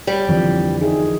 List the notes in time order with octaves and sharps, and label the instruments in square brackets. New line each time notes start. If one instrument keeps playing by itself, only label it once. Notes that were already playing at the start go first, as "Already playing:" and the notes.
[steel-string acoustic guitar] G3
[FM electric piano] F2 [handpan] D3 E3 F3
[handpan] D#4 E4 G#4